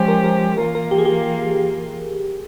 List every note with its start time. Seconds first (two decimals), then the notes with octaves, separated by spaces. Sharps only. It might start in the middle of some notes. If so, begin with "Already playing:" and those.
Already playing: F3 G#3 C#4 G4 C5
0.08 A#4
0.24 A#4
0.57 E3 A#3 F4 A#4
0.75 A#4
0.91 G4
0.98 G#4
1.05 G4